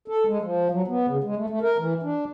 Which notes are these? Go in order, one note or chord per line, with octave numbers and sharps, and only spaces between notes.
A4
G#3
F3
F#3
B3
C#3
G#3
A3
A3
A#4
E3
D4